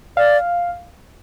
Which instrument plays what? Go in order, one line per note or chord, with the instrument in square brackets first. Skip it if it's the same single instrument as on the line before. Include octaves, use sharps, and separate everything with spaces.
[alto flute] D5 [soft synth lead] F5